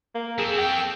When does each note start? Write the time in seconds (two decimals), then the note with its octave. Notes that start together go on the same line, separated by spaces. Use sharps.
0.15 A#3
0.38 C4 G#4 A4
0.58 G5